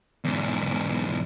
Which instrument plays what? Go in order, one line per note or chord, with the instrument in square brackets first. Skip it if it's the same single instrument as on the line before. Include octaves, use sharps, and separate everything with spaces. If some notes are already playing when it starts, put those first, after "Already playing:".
[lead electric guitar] E2 G#2